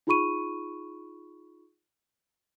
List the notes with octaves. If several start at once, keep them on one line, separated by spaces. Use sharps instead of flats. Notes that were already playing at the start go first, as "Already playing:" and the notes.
D#4 F4 G#4 B5 C#6 D#7